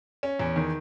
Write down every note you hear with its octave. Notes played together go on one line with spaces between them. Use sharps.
C#4
E2
D#3